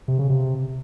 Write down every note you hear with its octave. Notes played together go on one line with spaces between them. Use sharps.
C3
C#3
C3